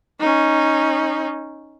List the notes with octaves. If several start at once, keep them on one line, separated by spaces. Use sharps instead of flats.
C#4 D#4